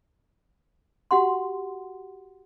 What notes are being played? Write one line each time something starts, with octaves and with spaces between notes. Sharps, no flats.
F#4 G4 F#5 C6